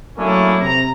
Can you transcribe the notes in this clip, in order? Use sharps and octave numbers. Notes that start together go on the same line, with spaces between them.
F#3 A3 A#3 C#4 D4 E4
C3 A#5